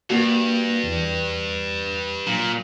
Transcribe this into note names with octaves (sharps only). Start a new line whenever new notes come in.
G2 A#3 F#4
E2
A#2 F#3